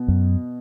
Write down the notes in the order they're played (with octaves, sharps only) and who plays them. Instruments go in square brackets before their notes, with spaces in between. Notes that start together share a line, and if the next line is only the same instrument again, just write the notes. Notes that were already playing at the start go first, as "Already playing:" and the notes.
Already playing: [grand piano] B2
[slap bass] F#2